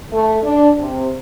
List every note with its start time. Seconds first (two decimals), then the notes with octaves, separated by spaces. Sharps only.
0.12 A3
0.43 D4
0.78 C3